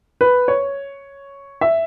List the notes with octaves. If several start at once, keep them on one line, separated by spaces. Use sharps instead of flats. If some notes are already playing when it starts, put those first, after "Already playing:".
B4
C#5
E5